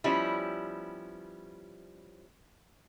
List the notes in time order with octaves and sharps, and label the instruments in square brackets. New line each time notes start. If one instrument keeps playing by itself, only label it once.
[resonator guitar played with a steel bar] F3 G3 B3 C#4 E4